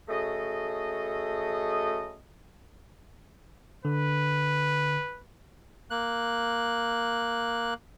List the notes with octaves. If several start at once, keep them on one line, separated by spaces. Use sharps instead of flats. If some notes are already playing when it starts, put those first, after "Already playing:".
C#3 A3 F#4 G#4 A4 D#5
D3 B4
A#3 F#6